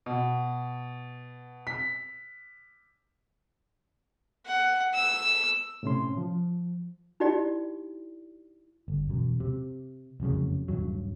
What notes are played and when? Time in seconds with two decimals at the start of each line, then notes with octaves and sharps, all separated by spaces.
0.06 B2
1.67 B6
4.46 F#5
4.94 E6
5.83 A2 C3 C#4 C6
6.17 F3
7.20 D#4 E4 F#4 G4 D5 G5
8.88 G1
9.09 E1 F#2
9.40 C3
10.20 F1 C2 F#2 C#3
10.68 D#1 C2 G2 F#3